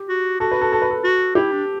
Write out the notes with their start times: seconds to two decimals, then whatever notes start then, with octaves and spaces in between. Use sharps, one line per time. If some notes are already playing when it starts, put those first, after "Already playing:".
Already playing: G4
0.09 F#4
0.40 F#4 A4
0.52 B4
0.61 A4
0.72 A4
0.82 B4
0.91 A4
1.04 F#4
1.35 E4 G4
1.52 D4